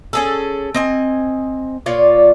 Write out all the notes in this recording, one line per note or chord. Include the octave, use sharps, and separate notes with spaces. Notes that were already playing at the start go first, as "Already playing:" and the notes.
C#4 G#4 A4
C4 D#5 G#5
A#2 F4 C#5 D5